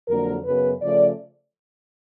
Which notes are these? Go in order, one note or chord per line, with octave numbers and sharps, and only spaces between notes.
F2 D3 F#3 A#3 A#4
F#2 C#3 F#3 B3 B4
C#3 F3 A3 D5